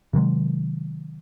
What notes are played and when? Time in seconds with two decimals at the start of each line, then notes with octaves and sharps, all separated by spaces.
0.13 C3 D#3 F#3 G#3